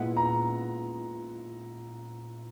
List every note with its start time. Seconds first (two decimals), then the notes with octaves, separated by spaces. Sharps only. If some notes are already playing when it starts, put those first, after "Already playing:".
Already playing: A#2 G#3 B3 E4 F#5
0.17 A#5